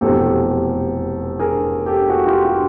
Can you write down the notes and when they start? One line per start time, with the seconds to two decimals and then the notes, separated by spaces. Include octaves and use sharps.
0.01 F1 E2 B2 G4 A4
1.39 G#4 A#4
1.86 G4 A4
2.10 F#4 G#4
2.26 F4 G4
2.45 F4 G4